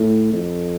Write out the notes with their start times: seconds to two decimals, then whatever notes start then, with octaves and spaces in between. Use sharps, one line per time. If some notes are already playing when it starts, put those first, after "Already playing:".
Already playing: A2
0.33 F2